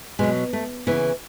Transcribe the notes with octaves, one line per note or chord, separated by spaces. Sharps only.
B2 F#3 G#3
A3
C#3 E3 B3